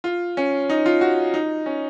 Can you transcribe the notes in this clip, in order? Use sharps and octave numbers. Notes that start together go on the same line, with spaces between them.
F4
C#4
D#4
F4
F#4
D#4
C#4